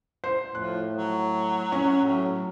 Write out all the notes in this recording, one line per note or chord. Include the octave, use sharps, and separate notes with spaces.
C5
A2 F3 F#6
F#3
C#4
A2 F#3